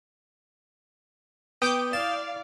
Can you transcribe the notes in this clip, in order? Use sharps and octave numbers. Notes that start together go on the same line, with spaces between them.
B3 G5 D6 D#6 G6
E4 D5 F5 A5